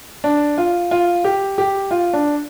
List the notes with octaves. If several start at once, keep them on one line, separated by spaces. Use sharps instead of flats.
D4
F4
F4
G4
G4
F4
D4